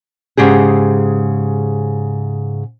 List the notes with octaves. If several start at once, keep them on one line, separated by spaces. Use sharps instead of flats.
G#2 C#3 G4 G#4